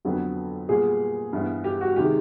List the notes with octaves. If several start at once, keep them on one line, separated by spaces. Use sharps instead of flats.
F2 D3 F#3 B3
A#2 G3 B3 G#4
G2 E3 G3 B3
G4
F#4
C3 D#3 G#3 G4